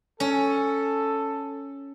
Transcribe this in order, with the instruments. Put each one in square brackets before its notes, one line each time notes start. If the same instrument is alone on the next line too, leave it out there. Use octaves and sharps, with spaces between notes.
[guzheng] C#4 [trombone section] A4